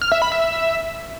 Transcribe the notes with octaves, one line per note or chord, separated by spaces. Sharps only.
F6
E5
B5
E5